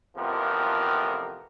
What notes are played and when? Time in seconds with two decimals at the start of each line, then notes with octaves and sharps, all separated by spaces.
0.16 A1 F2 C3 F3 B3 A#4